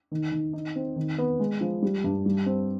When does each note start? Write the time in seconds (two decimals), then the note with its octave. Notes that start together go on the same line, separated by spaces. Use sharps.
0.12 D#3
0.32 D#3
0.53 D#4
0.76 C4
0.96 D#3
1.18 B3
1.40 G#3
1.61 F3
1.82 G3
2.04 G2
2.26 G3
2.46 C4